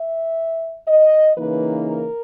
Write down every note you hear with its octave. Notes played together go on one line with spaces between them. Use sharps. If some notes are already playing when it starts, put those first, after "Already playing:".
Already playing: E5
D#5
C#3 E3 A#3 D#4 B4
A#4